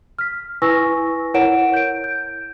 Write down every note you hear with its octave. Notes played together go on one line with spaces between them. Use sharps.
F6 B6
E4 B4 G#5 C#6 E6 A#6
E4 A#4 C#5 F#5 D7 E7
G6 D7
G6